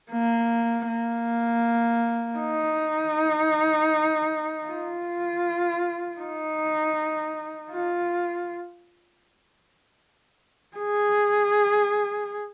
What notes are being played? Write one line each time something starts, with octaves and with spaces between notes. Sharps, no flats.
A#3
A#3
D#4
F4
D#4
F4
G#4